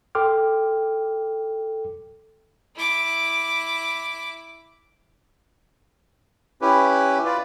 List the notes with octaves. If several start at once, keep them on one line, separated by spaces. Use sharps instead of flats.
A4 G5 C6 D6 F6
E4 D6
C#4 E4 G4 B4
F4 B4 D5